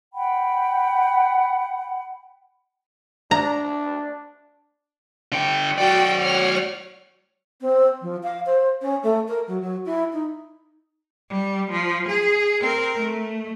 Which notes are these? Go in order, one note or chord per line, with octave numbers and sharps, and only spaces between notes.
F#5 G5 B5
D4 A#5
D3 G5
F#3 F#4 D5 G5
C#5 F#5 F6
C4
F3
F5
C5
C#4
A3
A#4
F#3
F#3
E4
D#4
G3
F3
G#4
C4 A#4
A3